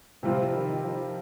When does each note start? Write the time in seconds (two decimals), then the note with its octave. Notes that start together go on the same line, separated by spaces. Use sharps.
0.23 C3 F3 G3 C4 F4
0.53 D#3
0.84 F3